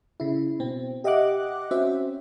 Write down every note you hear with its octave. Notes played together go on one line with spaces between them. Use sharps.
C#3 E4
B2 C4
G4 D#5 E5 F#5 D6 F#6
C4 C#4 F#4 C5 E5